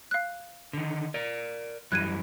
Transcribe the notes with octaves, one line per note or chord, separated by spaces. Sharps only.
F5 F#6
D3 D#3
A#4 D5
F#2 E3 G3 F#6 G#6 D#7